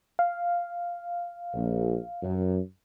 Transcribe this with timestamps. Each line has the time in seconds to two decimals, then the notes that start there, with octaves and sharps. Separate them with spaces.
0.19 F5
1.54 A#1
2.23 F#2